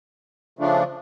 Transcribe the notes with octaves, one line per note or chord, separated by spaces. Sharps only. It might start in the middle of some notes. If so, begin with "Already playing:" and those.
C#3 F3 A3 D4